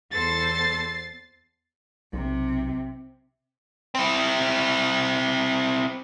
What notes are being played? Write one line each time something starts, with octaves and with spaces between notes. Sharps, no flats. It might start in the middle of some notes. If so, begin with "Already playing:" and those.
E2 A4 C5 A6 C7
B1 C3
C4 E4